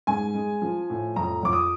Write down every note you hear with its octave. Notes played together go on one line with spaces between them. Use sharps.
G#2 G#5
G#3
F3
A2
F2 A#5
F2 D6
D#6